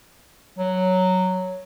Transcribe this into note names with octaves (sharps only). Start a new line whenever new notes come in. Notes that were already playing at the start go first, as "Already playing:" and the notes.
F#3